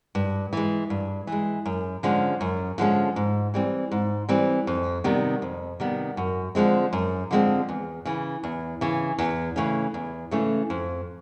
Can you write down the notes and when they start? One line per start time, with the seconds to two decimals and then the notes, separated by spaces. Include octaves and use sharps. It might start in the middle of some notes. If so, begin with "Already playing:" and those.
0.15 G2
0.53 E3 G#3
0.90 G2
1.27 E3 G#3
1.66 F#2
2.03 D3 F3 G#3 C#4
2.41 F#2
2.78 D3 F3 G#3 C#4
3.16 G#2
3.54 E3 G3 C4
3.92 G#2
4.29 E3 G3 C4
4.67 F2
5.04 C3 D#3 G3 B3
5.42 F2
5.80 C3 D#3 G3 B3
6.17 F#2
6.55 D3 F3 G#3 C4
6.93 F#2
7.31 D3 F3 G#3 C4
7.69 E2
8.05 C#3 E3
8.44 E2
8.81 C#3 E3
9.18 E2
9.56 C#3 E3 A3 C#4
9.94 E2
10.31 C#3 E3 A3 C#4
10.70 F2